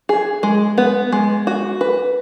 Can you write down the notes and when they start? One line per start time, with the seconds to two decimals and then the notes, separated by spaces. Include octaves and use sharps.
0.09 G#4
0.43 G#3
0.78 B3
1.12 G#3
1.47 F#4
1.81 B4